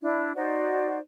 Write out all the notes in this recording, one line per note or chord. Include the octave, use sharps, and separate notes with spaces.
D4 E4
D#4 F#4 C5 D5